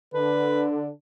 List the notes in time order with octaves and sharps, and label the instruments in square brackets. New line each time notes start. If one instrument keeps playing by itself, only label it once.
[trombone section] D3 D4 [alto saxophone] B4